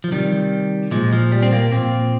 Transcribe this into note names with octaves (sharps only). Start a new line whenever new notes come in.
F3
C3 D#3 G3
A#2 F3 G#3
F3
G3
C4
A#3
A#2 F3 C4